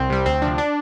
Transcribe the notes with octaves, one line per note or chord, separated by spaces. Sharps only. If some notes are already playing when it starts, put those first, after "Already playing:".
Already playing: C2 C4
C3 G3
D2 C4
C3 F3 D4
D4